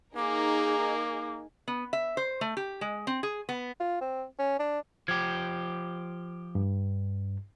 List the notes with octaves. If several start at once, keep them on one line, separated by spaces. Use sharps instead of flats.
A#3 D#4 G#4 A#4 D6
B3
E5
C5
A3
G4
G#3
C4
G#4
B3
F4
C4
C#4
D4
F3 G4 G#6
G2